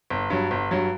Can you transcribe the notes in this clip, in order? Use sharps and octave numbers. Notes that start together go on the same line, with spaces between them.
G1
G2 F#3
G1
G2 F#3